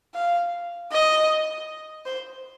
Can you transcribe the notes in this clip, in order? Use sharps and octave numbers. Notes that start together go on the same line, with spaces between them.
F5
D#5
C5